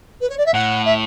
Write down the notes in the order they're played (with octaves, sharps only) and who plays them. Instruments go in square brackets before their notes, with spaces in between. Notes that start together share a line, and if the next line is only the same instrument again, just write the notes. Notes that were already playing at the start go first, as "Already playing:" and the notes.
[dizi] B4
C#5
D5
E5
[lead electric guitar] A2 [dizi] F#5
[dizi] E5